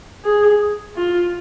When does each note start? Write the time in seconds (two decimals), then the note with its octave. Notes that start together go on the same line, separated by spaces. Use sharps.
0.25 G#4
0.96 F4